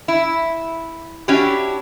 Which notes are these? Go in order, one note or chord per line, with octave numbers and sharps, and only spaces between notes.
E4
C#4 D4 E4 F#4 G4